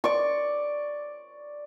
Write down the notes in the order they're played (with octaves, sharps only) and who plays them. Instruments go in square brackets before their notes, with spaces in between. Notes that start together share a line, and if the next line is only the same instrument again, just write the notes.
[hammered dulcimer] D5 C#6